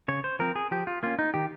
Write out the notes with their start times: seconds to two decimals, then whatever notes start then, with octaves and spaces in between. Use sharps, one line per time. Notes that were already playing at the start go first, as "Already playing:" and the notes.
0.08 C#3 C#5
0.24 C5
0.39 F3 C4 A#4
0.56 G#4
0.71 F3 G4
0.87 F4
1.03 A#3 C#4 F4
1.19 D#4
1.34 D#3 G4